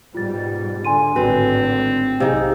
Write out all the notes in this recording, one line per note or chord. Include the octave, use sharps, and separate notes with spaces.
G#2 B2 G3 F4 A6
D3 G#5 C6 D#7
G#1 A2 D3 C4 F#4 B4
B1 C3 D#4 G#4 C5 F5 E6